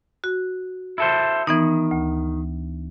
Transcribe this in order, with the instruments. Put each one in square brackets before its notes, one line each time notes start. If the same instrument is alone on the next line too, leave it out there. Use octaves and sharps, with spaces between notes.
[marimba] F#4
[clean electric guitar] E4 A4 C5
[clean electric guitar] D#3 [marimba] E3 B3 D#4
[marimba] D2